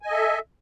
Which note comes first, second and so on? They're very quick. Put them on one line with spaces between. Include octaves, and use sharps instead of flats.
G#5 D#5 A4 E5